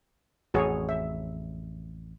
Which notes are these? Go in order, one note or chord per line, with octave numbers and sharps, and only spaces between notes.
A1 F2 F#4 G#4 C#5
E5